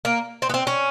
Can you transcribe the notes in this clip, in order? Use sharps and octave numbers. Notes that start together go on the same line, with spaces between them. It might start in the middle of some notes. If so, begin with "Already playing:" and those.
A#3
C4
B3
C4
C#4